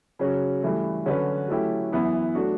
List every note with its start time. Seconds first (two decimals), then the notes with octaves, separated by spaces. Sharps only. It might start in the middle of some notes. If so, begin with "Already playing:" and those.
0.19 C#3 F#3 C#4 F#4
0.62 G2 E3 A3
1.06 D3 F#3 C#4 F#4 B4
1.48 F#3 A3 C#4 E4 G4
1.92 F#2 E3 B3 E4
2.35 F#3 A3 D4 F#4